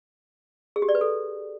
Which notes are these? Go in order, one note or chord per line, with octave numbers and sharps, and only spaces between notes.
G#4
G4
D5
B4
A4